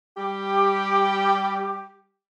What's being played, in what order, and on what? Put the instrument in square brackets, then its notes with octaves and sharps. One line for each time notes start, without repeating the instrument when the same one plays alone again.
[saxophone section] G3 G4